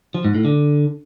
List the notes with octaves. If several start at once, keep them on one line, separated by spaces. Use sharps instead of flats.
F3
G#2
A2
D3